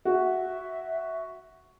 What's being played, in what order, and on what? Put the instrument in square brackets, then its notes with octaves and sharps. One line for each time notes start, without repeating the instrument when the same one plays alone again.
[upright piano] F#4 [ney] E5